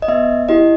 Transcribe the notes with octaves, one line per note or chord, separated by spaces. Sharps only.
D#5
B3 E5
E4 G4 D#5